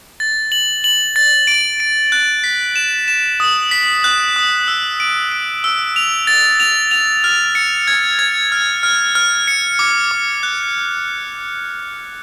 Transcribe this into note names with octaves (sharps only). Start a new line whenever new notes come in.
A6
F#7
F#7
A6
D7
D7
F#6
B6
E7
E7
D#6
B6
F#6
D#6
E6
D7
D7
E6
F7
A6
F7
F7
F6
C#7
G#6
G#6
F6
F6
F6
C#7
D6
D6
F#6